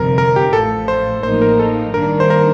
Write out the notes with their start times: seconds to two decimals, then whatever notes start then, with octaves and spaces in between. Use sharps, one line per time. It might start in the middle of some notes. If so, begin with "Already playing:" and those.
Already playing: G1 F2 C3 D#3 A#4
0.18 A#4
0.36 G4
0.53 A1 A2 F3 A4
0.88 C5
1.23 A1 A2 F3 A#3 D#4 C5
1.42 A#4
1.59 A4
1.94 G2 D#3 A#3 D4 A#4
2.20 C5
2.30 A#4